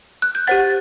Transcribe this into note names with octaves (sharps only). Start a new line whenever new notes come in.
F#6
G6
G4 C5 F#5 A6